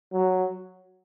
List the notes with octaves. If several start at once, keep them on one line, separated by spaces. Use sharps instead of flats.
F#3